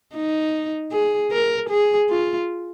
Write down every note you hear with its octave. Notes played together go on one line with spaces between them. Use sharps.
D#4
G#4
A#4
G#4
F4